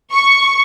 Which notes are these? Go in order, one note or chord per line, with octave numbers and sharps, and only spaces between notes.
C#6